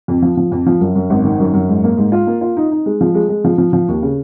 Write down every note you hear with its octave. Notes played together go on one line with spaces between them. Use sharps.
F2
F3
F3
F2
F3
F#2
F#2
G#1
D#3
F#2
F#2
G#2
A#3
G#2
F4
A#3
F4
D#4
D#4
G#3
F3
G#3
G#3
F3
F3
F3
D#2
C#3